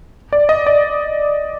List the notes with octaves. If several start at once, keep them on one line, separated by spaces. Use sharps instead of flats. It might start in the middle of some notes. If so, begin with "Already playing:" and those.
D5
D#5
D5